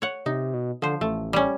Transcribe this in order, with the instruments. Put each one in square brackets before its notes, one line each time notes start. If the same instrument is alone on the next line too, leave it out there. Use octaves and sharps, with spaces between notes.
[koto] C#5 F#5
[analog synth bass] C3 [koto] D#4
[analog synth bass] B2
[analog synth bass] D3 [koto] F3 C5
[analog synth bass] A1 [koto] A3
[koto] G3 C#4